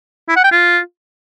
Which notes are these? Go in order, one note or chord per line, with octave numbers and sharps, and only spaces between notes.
E4
F#5
G5
F4